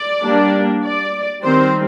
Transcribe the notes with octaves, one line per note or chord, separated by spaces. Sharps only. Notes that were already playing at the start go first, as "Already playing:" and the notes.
Already playing: D5
G3 A#3 D4
D5
D#3 G3 C4 C5